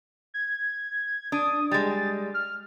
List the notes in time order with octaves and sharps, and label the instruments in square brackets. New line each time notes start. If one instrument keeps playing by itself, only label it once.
[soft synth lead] G#6
[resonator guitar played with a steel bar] D4 [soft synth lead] D#6
[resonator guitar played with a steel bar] G3 G#3 [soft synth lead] A6
[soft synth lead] F6